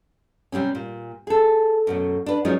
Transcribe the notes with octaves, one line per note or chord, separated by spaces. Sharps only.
C3 G3 C4 C#4
A#2
G#4 A4
F#2 B2 A3
D4 B4
F3 F#3 G#3 C#4 D#4 F4